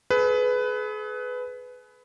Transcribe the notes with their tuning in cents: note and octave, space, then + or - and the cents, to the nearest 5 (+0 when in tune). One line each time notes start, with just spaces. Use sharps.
G#4 +40 B4 +15